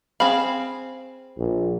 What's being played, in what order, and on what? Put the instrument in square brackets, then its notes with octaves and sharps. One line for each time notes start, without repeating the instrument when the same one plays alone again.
[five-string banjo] C4 G#4 F5 [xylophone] B5
[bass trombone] A#1